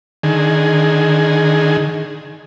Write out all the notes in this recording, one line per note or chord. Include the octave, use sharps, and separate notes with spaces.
D3 D#3 G#4